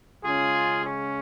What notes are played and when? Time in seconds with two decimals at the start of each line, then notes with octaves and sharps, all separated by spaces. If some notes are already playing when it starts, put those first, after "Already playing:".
0.24 C#3 G#3 C#4 F4 G#4
0.84 C#4